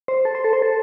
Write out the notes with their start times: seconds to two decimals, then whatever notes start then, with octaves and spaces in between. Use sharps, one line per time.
0.08 C5
0.25 A4
0.35 C5
0.44 A4
0.53 C5
0.62 A4